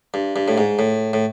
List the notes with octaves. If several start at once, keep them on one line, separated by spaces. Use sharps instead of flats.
G2
G2
A2
G#2
A2
A2